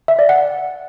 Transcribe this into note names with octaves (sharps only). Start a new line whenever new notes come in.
E5
D5
F#5